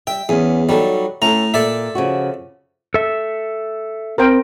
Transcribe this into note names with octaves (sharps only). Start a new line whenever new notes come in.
G3 E5 G5
E2 B3 C#4 G#4
F#3 G3 D#4 A4
A2 C#4 A4 A#5
A#2 A4 D5 E5
C#3 F3 F#4
A4 E5
C4 A#4 C5 G5